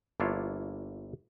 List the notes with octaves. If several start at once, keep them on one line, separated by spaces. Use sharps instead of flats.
G1 A#3 D4 E4 F4 C#5